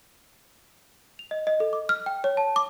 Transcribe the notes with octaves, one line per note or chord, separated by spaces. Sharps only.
F7
D#5
D#5
A4
D6
F6
G5
C#5
A5
D6